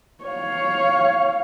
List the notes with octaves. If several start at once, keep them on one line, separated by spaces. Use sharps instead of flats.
C#5 F5